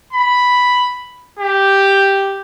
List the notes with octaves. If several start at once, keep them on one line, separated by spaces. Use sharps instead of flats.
B5
G4